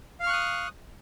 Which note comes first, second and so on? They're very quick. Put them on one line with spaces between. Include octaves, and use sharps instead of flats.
F5 F6 C#6 F#6 D#6